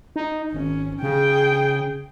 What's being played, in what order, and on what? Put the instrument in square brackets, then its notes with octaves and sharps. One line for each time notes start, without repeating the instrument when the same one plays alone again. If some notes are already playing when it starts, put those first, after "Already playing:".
[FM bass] D#4
[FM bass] G#1 [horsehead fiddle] C#4
[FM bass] C#3 [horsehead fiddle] G#4 G5